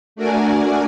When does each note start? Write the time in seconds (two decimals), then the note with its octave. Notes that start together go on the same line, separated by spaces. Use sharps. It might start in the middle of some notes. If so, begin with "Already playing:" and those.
0.16 A3 D4 F#4 A#4 D5 G#5